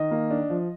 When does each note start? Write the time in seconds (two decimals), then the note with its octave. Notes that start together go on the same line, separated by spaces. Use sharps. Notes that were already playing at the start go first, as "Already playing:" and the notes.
Already playing: D#3 D#5
0.11 A#3
0.31 D4
0.50 F3